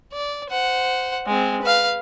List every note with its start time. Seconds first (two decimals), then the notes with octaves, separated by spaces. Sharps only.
0.13 D5
0.50 C5 F#5
1.26 G#3 C4
1.62 B4 F5